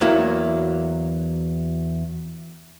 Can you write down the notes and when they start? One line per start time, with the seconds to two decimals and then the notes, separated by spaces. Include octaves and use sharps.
0.01 E2 F#3 A#3 E4